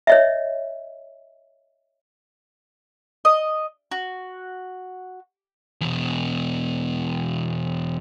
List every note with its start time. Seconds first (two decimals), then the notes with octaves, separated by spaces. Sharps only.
0.07 C#5 D#5 E5
3.25 D#5
3.91 F#4
5.81 E2 B2